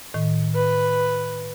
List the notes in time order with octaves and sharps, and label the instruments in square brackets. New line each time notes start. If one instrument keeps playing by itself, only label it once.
[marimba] A2 D#3
[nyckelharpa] B4